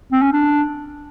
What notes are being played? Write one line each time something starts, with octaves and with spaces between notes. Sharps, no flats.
C4
C#4
D4